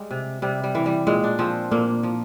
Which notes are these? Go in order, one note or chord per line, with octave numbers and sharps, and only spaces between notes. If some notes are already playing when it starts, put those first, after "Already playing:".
Already playing: G3 G#3
C3
C3 G3
G3
E3
G3
A#2 G#3
D4
F3 C4
A#2 A#3
F3